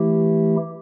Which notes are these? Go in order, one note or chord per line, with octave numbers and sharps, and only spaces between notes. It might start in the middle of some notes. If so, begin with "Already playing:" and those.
Already playing: E3 A3 E4 G4